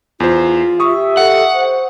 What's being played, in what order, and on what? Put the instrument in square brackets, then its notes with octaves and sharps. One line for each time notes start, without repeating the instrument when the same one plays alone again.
[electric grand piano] E2 C5 [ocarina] F4
[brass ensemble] G4 E5 [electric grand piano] C#6 D#6
[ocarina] A4 [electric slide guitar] F#5
[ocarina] C5